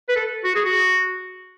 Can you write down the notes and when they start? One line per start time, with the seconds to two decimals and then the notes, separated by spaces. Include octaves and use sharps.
0.09 B4
0.15 A4
0.44 F#4
0.55 G#4
0.65 F#4